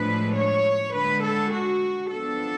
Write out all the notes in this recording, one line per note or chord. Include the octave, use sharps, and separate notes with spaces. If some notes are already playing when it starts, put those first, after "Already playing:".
Already playing: A2 F3 G#3 D4 B4
C#5
D3 G#3 D4 B4
A4
F#4
F3 B3 D4 A4